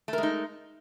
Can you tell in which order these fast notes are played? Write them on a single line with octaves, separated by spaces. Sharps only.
A3 A#4 G#3 D#4